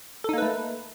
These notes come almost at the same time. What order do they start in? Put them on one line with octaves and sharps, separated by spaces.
A4 D#4 A#3 B4 A3